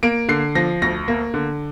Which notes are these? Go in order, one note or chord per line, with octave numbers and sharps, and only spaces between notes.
A#3 D7
D3 C7
F3 A#6
D2 A#6
A#3
D3